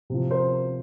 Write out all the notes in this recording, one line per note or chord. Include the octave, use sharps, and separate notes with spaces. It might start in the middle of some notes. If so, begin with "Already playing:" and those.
C3 F3
A#4 C5